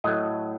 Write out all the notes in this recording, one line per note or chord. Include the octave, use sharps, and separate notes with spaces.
A2 F#3 A3 D#5